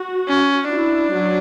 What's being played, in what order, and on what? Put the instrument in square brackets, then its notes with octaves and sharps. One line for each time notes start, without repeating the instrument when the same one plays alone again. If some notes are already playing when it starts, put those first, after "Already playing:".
Already playing: [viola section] F#4
[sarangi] C#4
[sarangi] D4 [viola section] E4
[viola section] F#3